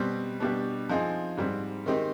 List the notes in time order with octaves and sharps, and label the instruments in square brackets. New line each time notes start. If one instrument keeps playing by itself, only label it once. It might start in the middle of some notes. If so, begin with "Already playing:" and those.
Already playing: [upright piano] B2 G3 C4 G4
B2 G3 D4 G4
F3 C4 D#4 G#4
G#2 G3 C4
D#3 G#3 C4 D#4 G4